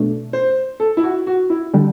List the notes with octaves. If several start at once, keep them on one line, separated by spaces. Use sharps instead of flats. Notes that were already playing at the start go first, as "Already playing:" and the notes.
Already playing: B2 A3 D4
C5
A4
E4
F#4
F#4
E4
D3 G3